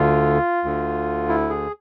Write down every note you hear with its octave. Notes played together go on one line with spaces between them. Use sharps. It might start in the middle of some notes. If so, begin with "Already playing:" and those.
Already playing: D2 D3 F4
D2 D3
E4
G#4